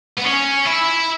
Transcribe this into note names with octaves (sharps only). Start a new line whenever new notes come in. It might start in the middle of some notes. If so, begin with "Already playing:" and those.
B3
C#4
E4